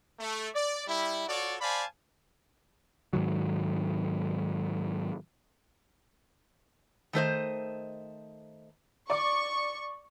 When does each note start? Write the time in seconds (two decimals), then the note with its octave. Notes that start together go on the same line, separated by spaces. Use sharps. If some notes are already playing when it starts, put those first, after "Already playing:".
0.19 A3
0.55 D5
0.87 G3 E4
1.27 F4 F#4 A4 C#5 D5
1.61 C5 D5 F5 G#5 A5 B5
3.13 G#2 D#3 F#3
7.13 D#3 A3 C5 D#5
9.10 D5 C#6 D6